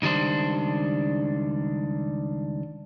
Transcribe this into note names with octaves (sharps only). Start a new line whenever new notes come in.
C#2 D#3 G3 D4 C5